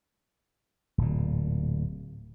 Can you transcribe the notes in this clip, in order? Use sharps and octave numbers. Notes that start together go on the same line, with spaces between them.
D1 A#2